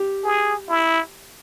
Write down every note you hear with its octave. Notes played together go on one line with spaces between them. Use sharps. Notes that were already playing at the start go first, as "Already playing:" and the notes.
Already playing: G4
G#4
E4